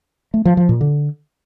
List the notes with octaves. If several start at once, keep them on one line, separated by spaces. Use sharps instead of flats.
A3
F3
F3
A#2
D3